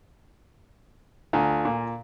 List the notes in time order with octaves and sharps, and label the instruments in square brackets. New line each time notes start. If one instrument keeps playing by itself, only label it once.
[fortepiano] D2 [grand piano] F4 G#5 A#5
[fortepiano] A#2